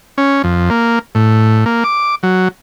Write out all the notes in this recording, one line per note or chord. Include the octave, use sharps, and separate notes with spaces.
C#4
F2
A#3
A2
A#3
D6
F#3